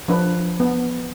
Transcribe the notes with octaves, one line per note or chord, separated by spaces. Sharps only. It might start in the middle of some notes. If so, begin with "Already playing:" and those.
F3 D4 B4
B3